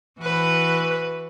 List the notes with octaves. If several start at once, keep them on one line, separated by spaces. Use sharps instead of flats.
E3 F#4 B4